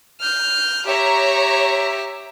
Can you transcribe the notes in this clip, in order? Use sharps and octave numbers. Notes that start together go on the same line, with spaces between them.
F6 G6
G4 C#5 E5 A#5